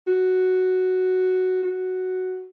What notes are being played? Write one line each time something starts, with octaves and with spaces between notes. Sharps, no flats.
F#4
F#4